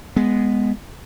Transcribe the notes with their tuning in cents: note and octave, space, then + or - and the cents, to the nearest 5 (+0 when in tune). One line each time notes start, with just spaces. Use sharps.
G#3 -5 B3 +0